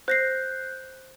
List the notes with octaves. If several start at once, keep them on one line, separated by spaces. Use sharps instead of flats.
C5 F#6 G6 A#6 C7